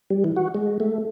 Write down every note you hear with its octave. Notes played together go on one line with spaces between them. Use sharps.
G3
E3
F#4
G#3
A3